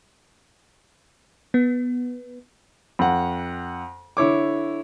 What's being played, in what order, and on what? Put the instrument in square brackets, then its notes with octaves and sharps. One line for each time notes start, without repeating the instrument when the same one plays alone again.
[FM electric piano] B3
[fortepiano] F2 F#5
D3 E4 C#5 D6